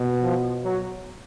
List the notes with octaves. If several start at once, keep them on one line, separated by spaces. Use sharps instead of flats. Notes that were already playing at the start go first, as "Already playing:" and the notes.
Already playing: B2
F3
F#3